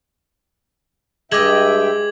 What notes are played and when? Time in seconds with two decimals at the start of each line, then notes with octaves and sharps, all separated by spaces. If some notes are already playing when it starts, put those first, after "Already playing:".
1.32 G2 G#3 D#5 E5 G5 D6 G#6 F#7